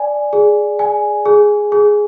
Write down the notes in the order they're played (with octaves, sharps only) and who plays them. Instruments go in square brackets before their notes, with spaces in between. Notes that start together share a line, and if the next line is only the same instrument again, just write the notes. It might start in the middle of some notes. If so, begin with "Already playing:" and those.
Already playing: [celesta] D5 G#5
G#4
G#5
G#4
G#4